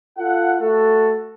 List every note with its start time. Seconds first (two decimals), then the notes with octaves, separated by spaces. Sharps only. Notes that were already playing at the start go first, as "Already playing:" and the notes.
0.18 F4 A4 F5 F#5
0.60 A3 F#4 A4